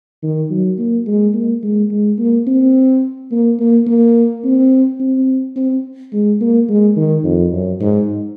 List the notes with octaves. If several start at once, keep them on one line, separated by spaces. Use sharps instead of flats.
D#3
F#3
A#3
G#3
A#3
G#3
G#3
A#3
C4
A#3
A#3
A#3
C4
C4
C4
G#3
A#3
G#3
D#3
F2
F#2
G#2